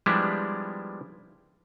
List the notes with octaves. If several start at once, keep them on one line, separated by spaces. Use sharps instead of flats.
F3 G3 G#3 B3 D4 E4